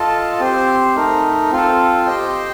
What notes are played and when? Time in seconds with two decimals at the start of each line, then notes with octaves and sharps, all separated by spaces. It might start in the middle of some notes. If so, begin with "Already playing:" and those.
Already playing: F4 A4 D#5 A5
0.40 C4 G4 C5
0.95 A3 D#4 A#4
1.51 C4 F4 A4
2.06 G4 C5 D#5 G5